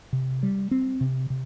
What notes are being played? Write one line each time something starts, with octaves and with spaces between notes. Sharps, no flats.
C3
G3
C4
C3
C3